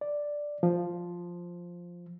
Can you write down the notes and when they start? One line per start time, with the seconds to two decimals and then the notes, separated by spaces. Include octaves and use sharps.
0.01 D5
0.63 F3